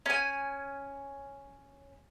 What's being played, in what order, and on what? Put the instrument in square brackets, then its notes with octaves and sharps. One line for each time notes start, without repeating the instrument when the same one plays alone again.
[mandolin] C#4 G#5